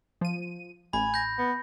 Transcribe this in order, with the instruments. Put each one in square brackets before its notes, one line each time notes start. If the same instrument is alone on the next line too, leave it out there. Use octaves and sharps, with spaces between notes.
[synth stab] F3 D#7
[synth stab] A1 [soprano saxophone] G#5 [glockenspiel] B5
[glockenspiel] G6 A#6
[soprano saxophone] B3